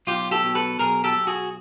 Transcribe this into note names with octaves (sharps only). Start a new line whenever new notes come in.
B1 F4 G4
G4 A4
B2
A4 B4
B1 G#4 A#4
G4 A4
B1
F#4 G#4